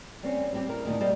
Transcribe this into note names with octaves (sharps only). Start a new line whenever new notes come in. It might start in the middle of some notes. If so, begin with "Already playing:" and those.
G3 C4 C#4
G3 C4 G4
E4 A#4
D2 A#2 D#3
G3 A#3 G4 C5 D5 D#5